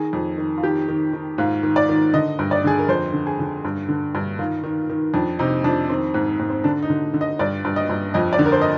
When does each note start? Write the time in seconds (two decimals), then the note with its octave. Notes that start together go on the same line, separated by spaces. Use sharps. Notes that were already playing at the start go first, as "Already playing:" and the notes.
Already playing: D#3 G#4
0.13 F2
0.38 D#3
0.58 F4
0.63 D#3 G4
0.88 D#3
1.13 D#3
1.38 G#2 F4
1.63 D#3
1.76 D5
1.89 D#3
2.14 D3 D#5
2.39 G2
2.51 D5
2.64 D3 G#4
2.79 A#4
2.89 F2 C5
3.13 D3
3.27 G#4
3.39 D3
3.64 G2
3.89 D3
4.15 G2
4.39 D#3 F4
4.64 D#3
4.89 D#3
5.14 F2 D4
5.39 C3 D#4
5.64 F2 D4
5.89 D#3 C4
6.14 G#2
6.39 G#2
6.50 C4
6.64 D3 D4
6.82 D#4
6.90 D3
7.14 D3
7.21 D#5
7.39 G2 D5
7.65 G2
7.76 D#5
7.89 G2
8.14 F2 D#5
8.33 D5
8.39 D3
8.46 A#4
8.52 C5
8.62 D#5